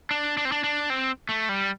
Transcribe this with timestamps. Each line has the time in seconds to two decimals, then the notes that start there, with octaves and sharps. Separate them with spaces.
0.11 D4
0.37 D4
0.45 C4
0.52 D4
0.64 D4
0.90 C4
1.29 A3
1.49 G3